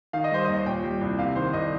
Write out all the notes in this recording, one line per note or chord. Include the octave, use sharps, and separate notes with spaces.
D#3 F5
D#5
G3 C5
D#2 D#5
A#2 G5
G3
C2
C3 F5
D#3 C5
C2 D#5